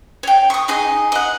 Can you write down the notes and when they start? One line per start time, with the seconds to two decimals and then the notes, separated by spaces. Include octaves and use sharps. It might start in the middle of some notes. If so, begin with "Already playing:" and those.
0.23 C#5 G5
0.50 C#6 D#6
0.68 D#4 G#4 D#5
1.12 D#5 F#5